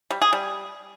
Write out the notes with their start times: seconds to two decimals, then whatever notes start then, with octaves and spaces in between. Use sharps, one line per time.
0.10 G3
0.22 G#4
0.33 G3